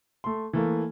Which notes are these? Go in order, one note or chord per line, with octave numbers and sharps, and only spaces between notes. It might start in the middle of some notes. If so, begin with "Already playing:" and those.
A3 C6
E3 A3 A#3